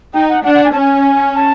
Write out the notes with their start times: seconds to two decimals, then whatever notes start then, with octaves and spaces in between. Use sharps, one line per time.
0.14 D#4 G5
0.29 F#5
0.44 D4 F#5
0.54 F#5
0.65 G#5
0.72 C#4 A5
0.80 G#5
1.35 A5